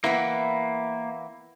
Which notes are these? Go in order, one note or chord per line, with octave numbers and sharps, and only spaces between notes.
E3 A#3 B3 E4